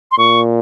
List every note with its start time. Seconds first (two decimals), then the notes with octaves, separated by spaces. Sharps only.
0.11 C6
0.18 A#2 C#6